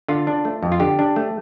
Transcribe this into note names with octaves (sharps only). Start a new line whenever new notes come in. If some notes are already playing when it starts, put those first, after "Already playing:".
D3 F4
D4
A3
F2
F4
D3 G4
D4
A3